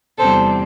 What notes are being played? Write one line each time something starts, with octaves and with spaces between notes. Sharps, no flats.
E2 C3 G3 C4 A4 C5